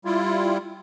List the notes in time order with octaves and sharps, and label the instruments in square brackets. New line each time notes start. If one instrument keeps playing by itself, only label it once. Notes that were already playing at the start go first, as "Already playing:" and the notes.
[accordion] G3 E4 F4